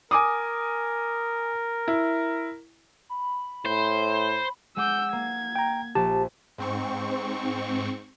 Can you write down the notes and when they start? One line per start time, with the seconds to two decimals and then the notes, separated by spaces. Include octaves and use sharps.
0.11 A#4 G#5 D6 D#6
1.88 E4
3.09 B5
3.65 A2 C5
4.76 G#3 F#5 D6 E6 G6
5.13 A#3 G#6
5.56 G5 A#5
5.95 A#1 G4 A5
6.58 G#2 C4 C#6